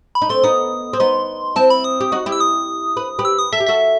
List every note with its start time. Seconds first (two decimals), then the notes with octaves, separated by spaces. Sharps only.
0.15 B5
0.22 D#4
0.29 A3 C4 C6
0.43 B3 D#4 D#6
0.93 C4
1.00 B3 D#4 C6
1.56 C4 E4 A5
1.70 B5
1.84 D#6
2.00 G4
2.12 D#4 F#4
2.26 E4 G4
2.32 E6
2.40 D#6
2.97 B4
3.19 G4 B4
3.25 E6
3.39 D#6
3.53 A4 E5
3.60 G4
3.66 F#4 A4 E5